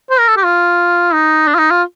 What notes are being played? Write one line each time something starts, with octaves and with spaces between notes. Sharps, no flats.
C5
A#4
A4
G4
F4
D#4
D4
F4
D#4
F4